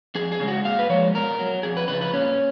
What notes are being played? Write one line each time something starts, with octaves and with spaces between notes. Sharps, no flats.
F2 G#4
G#4
C#3 G#3
F#4
A#2 F5
B4
F3 G#3 C#5
B2 A#4
F#3
F2 G#4
B4
C#3 F3 B4
B4
A#2 C#4